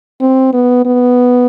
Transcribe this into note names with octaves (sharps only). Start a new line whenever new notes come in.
C4
B3
B3